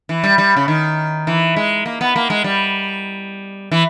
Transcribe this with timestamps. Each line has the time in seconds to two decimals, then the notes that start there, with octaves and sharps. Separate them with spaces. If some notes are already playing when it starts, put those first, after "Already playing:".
0.09 E3
0.24 G3
0.38 G3
0.56 C#3
0.68 D#3
1.27 E3
1.56 G#3
1.86 A#3
2.01 B3
2.16 A#3
2.30 G#3
2.44 G3
3.71 E3